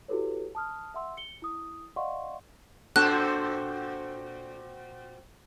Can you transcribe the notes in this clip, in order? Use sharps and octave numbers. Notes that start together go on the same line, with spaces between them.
E4 F#4 G4 A4 B4 C#5
A5 D#6 F6
E5 F#5 C6 E6
C#7 G7
E4 D#6
D5 D#5 F5 F#5 C6 C#6
A#2 C4 D4 F#4 A4 C5 F#6